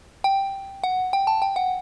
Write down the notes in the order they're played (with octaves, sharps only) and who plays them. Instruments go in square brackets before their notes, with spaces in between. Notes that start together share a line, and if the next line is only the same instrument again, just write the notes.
[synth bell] G5
F#5
G5
A5
G5
F#5